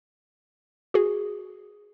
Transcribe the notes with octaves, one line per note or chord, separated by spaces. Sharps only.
F#4 G#4